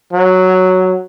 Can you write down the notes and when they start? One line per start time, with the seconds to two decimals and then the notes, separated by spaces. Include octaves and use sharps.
0.13 F#3